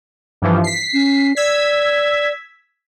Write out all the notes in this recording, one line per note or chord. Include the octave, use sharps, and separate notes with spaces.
G2 E3 F3
B6 C7
C#4
D5 E6 G#6 B6